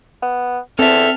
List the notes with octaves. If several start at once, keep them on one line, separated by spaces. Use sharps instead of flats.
B3
E2 C4 A4 E5 A5 F6